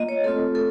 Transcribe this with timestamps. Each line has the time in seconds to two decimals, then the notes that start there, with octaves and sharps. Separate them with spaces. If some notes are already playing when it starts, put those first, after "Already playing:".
Already playing: A#3 F4 D#5
0.09 C#5
0.24 A3 C4 F4 A4
0.55 A4